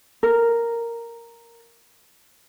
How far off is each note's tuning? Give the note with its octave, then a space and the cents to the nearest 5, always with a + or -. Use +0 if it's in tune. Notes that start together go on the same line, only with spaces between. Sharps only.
A#4 -5